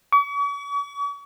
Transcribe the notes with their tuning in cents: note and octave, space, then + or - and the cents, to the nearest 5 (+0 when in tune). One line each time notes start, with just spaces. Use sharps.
C#6 +45